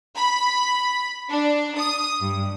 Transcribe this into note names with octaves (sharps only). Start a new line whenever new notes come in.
B5
D4
D#6
G2